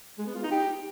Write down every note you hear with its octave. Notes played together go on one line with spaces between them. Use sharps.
G#3
B3
F4
D#4
G4